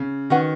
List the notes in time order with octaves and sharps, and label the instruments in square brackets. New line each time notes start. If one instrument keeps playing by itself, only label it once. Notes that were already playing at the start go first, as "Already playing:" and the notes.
Already playing: [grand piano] C#3
[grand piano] D#3 [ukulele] C#4 F#4 B4 F#5